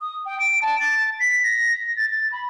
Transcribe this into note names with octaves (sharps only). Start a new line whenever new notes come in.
D#6
G5
D7
A5
A6
B6
A#6
A6
A6
B5